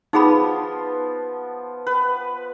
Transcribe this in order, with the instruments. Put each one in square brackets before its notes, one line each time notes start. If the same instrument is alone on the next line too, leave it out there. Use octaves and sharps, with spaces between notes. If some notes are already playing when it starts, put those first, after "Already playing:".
[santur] F3 B3 [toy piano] D#4 G#4 B5
[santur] B4